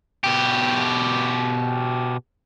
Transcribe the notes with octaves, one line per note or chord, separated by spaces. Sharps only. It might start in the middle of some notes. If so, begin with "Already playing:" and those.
B2 G4